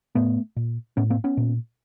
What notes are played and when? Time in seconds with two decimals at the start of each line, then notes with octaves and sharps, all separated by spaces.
0.15 A2 A3 B3
0.56 A#2
0.97 A2 B3 C#4
1.10 A#3 C4
1.24 B3 C#4
1.37 A#2